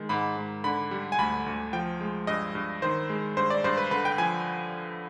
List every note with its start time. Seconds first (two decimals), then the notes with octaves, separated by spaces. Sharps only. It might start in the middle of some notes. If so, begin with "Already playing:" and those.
Already playing: D#3 G#3
0.09 G#2 B5
0.37 G#2
0.64 D3 B5
0.91 G3
1.12 G#5
1.18 D2 B5
1.46 D2
1.73 F3 G5
2.01 G#3
2.27 G2 D#5
2.55 G2
2.82 D#3 C5
3.10 G#3
3.37 G2 C5
3.50 D5
3.64 G2 C5
3.78 B4
3.91 D3 B4
4.05 G5
4.18 F3 G#5